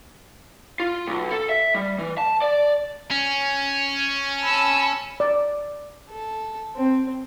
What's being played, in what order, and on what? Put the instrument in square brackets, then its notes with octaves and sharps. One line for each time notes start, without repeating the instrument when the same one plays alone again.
[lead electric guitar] F4
B1
A4
E5
G3
E3
A5
D5
[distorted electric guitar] C#4
[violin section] A5 B5 E6
[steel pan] D5
[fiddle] A4
C4